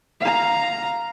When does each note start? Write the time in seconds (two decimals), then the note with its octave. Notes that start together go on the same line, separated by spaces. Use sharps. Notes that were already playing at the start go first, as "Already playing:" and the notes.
0.21 F5 A#5